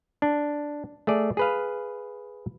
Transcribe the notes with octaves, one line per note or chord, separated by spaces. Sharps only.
D4
A3 G#4 D5
G#4 B4 F5